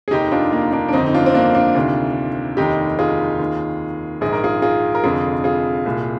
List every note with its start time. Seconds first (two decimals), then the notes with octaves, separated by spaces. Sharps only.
0.08 G#4
0.11 F1 D#2 D#3 D#4 G4
0.32 D4 F4
0.53 A#3
0.73 A#3 D4
0.88 D4
0.93 G1 F2 D#3 C4 D#4
1.06 D#4
1.15 D4 F4
1.26 C4
1.34 A#3 D4
1.55 D4 F4
1.75 D2 C3 D#3
2.57 F1 D#2 D#3 D#4 G4
2.99 F4 G#4
3.39 D#2 D#3
4.21 A#1 G#2 D#3 G#4
4.33 A#4
4.43 F4 G#4
4.62 F4 G#4
4.95 A#4
5.04 F1 F2 D3 F4 G#4
5.44 F4 G#4
5.86 C2 A#2